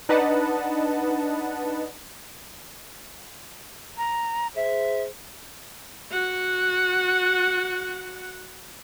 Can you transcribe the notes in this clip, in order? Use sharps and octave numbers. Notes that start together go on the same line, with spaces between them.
D4 D#4 B4 D#5 F#5 A5
A#5
G#4 C5 E5
F#4 F#5